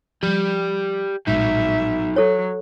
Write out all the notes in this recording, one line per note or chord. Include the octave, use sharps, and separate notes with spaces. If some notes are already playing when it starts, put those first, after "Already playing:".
F3 G3 G4 D5
A#1 A2 F#3 G#3 D#4 E5
F#3 A4 C#5